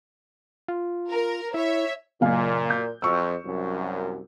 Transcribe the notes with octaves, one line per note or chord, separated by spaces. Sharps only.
F4
A#4
E4 C#5 E5
F#1 A#2 F5 G#5
G6
F2 C#6 E6
C2 F#2